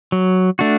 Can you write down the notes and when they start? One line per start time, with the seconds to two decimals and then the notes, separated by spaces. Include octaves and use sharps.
0.12 F#3
0.59 A3 D4 F#4